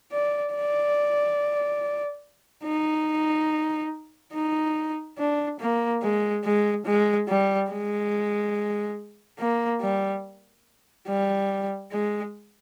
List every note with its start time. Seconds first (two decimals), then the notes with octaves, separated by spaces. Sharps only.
0.11 D5
0.54 D5
2.65 D#4
4.33 D#4
5.18 D4
5.59 A#3
6.02 G#3
6.45 G#3
6.86 G#3
7.28 G3
7.70 G#3
9.39 A#3
9.81 G3
11.07 G3
11.92 G#3